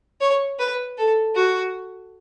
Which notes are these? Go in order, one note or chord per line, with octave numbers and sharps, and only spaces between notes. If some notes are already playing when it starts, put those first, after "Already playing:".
C#5
B4
A4
F#4